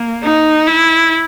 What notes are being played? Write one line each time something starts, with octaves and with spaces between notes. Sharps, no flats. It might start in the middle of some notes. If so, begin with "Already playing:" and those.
Already playing: A#3
D#4
E4